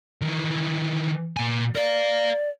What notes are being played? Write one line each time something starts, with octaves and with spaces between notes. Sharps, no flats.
D#3 E3
A#2 G#5
A#4 D5 F5